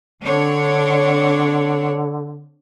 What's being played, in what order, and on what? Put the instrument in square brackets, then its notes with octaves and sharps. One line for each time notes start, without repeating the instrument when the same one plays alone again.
[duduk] D3 [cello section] C4 D4 C#5